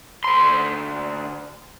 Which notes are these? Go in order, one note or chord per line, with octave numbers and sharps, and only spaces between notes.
D2 C6